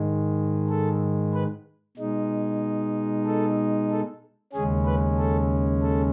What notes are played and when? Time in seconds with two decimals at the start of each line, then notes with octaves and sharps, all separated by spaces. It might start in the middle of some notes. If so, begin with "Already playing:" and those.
Already playing: G#2 D#3 G#3
0.69 A4
1.34 B4
1.97 B2 G#3 D#4
3.26 A4
3.90 A4
4.53 D#2 C#3 G#3 C#4 G#4
4.86 B4
5.17 A4
5.82 A4